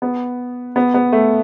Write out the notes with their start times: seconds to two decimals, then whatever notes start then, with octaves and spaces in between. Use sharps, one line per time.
0.02 B3
0.76 B3
0.94 B3
1.12 A3